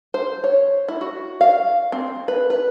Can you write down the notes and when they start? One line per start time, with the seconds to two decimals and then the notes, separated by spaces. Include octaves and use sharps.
0.14 C5
0.44 C#5
0.88 E4
1.01 F#4
1.41 F5
1.92 C4
2.28 B4
2.50 B4